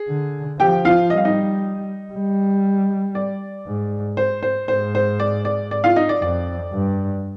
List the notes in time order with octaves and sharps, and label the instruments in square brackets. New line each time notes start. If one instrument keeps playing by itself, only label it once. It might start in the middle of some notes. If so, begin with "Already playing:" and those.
Already playing: [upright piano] G#4
[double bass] D3
[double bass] F3 [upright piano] G4 G5
[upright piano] F4 F5
[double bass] G3 [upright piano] D#5
[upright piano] F5
D#4 D#5
[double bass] G3
[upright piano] D5
[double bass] G#2
[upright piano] C5
C5
[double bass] G#2 [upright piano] C5
[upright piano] C5
D5
D5
D5
F4 F5
D#4 D#5
D5
[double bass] F2 [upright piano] D5
[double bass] G2